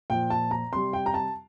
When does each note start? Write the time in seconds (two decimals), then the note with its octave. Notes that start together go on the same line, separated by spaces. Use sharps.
0.10 A#2 F3 G5
0.30 A5
0.51 A#5
0.72 C3 G3 C6
0.93 G5
1.06 A#5
1.14 A5